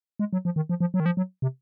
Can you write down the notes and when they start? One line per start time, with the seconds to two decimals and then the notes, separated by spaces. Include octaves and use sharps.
0.19 G#3
0.33 F#3
0.45 F3
0.56 D#3
0.69 F3
0.80 F3
0.94 F#3
1.00 D#3
1.06 F3
1.17 F#3
1.42 C3